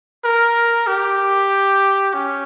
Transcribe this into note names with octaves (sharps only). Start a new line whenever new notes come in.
A#4
G4
C#4